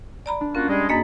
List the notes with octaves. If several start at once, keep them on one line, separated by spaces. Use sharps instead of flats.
D5 A#5 B5
D4
A#3 C#4 F4 F#4
G3 G#3
F#2 A#3 G#4 D#5 B5